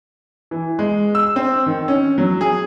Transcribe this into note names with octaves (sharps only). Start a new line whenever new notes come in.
E3
G#3
E6
C4
D#3
C#4
F#3
G#4